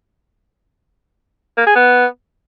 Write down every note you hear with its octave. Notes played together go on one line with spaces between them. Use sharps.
A#3
G#4
B3